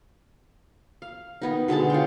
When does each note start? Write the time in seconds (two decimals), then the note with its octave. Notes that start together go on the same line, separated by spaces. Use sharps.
1.02 F5
1.42 D#3 B3 D#4
1.68 B2 D3 G#3 A5
1.90 F4 C#5 G5